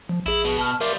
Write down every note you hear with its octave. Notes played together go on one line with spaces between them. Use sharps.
F3
A#1 E4 G#4
B2
A5 F6
G3 F4 A#4 E5 D6